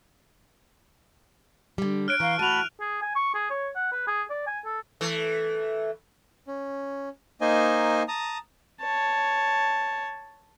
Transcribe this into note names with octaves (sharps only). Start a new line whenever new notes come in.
D3 G3
C#5 F6 F#6 D7
E3 F5 A#5 C#6
A2 F#4 A5 B5 D#7 F7
G#4
G#5
C#6
G#4
C#5
F#5
B4
G#4
D5
G#5
A4
E3 A3
C#4
A#3 D#4 C5 D#5 G#5
A5 A#5 D#6
C#5 A5